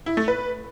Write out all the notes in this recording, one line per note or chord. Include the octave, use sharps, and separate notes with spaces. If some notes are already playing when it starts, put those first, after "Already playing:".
E4
A3
B4